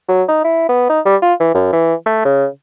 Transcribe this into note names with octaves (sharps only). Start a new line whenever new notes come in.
F#3
D#4
E4
B3
D#4
G3
F4
E3
F#2
E3
A3
C#3